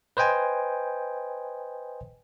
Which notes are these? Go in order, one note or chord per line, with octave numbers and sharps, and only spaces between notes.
B4 C5 D#5 G5 G#5